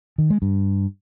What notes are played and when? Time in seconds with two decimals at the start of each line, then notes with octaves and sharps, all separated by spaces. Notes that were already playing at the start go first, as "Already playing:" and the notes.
0.18 D#3
0.30 G#3
0.42 G2